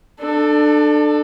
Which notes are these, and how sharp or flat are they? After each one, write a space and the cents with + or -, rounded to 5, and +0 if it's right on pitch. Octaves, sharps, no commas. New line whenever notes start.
D4 +25 A4 +0